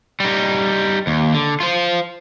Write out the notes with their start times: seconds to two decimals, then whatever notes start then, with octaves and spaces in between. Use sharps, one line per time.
0.20 G3 D#4
1.07 D#2
1.34 D3
1.60 F4 C5